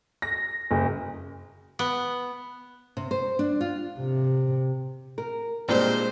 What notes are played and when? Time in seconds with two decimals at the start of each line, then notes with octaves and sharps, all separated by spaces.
0.22 A#6
0.71 F#1
1.79 B3
2.97 C3
3.11 C5
3.39 D4
3.61 F4
4.00 C3
5.18 A#4
5.69 A#2 G3 G#3 C4 D4 C5